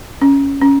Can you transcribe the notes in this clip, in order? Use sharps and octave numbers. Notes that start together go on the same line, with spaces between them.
C#4
C#4